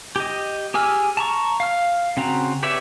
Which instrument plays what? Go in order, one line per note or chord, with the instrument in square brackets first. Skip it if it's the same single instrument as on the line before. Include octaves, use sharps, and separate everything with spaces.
[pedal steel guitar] G4 D#5
G4 G#4 G#5 E6 F6
A5 A#5 C#6
F5 F6
C#3 C4 F#4 A#5
G4 B4 C#5 D5 E5